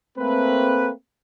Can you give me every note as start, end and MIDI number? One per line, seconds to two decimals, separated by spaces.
0.18 0.91 57
0.18 0.91 58
0.18 0.91 60
0.18 0.91 71